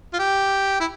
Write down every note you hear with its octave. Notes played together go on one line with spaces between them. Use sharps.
F4
G4
E4